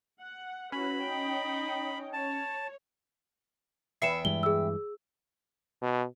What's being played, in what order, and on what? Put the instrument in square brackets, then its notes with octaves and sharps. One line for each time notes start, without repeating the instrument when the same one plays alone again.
[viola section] F#5
[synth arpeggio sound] C#4 [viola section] E4 F#4 B4 [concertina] B5
[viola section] D#4 G5
[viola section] C#5 [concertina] A5
[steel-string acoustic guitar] E2 E5 G5 [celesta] C7 C#7 E7
[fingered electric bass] G2 E3 G#3 [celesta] G7
[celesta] G#4 E6
[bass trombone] B2